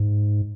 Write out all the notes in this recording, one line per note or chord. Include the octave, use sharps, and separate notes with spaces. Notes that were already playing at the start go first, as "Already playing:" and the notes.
Already playing: G#2